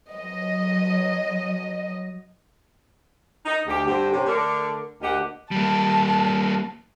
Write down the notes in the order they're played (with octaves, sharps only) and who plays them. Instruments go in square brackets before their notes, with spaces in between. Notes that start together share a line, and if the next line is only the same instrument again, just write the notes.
[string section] F#3 D#5
[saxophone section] D#4
D2 G4
G2 D3 C4 G4
C3 C#4 G4
D3 A3 D4 A#4
D2 A#2 G4 D#5 F#5
[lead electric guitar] G3 A#3 [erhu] A5